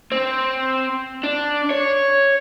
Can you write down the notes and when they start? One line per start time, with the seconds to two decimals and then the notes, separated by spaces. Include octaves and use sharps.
0.12 C4
1.24 D4
1.70 C#5